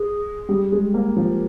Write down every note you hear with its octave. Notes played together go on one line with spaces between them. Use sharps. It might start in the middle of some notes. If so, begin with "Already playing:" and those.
Already playing: G#4
G3
G#3
A#3
F3
A#4